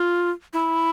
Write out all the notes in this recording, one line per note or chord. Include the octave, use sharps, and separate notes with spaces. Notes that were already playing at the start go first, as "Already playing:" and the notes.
Already playing: F4
E4